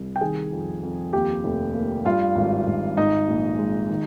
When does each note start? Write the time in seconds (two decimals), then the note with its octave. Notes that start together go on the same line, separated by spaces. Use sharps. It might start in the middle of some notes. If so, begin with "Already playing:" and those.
Already playing: C2
0.16 G5
0.21 D#3 G#4 G#5
0.52 F2
0.83 F2
1.13 D#2 G4 G5
1.44 F1
1.75 A#3
2.05 G2 F4 F5
2.36 G#1
2.67 G#1
2.97 G#2 D#4 D#5
3.28 A#1
3.59 G#3
3.90 D#3